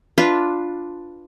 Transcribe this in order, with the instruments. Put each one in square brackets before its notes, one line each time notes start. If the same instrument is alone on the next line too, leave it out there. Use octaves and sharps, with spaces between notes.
[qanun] D4 F4 B4